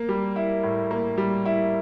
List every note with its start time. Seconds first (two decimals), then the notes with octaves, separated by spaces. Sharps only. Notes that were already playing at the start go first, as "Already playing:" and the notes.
Already playing: A#3
0.09 G3
0.36 E4
0.63 A2
0.91 A#3
1.18 G3
1.46 E4